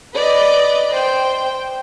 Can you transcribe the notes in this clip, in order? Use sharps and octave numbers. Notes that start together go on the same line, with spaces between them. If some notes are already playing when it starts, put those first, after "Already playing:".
B4 D5 D#5
C5 G5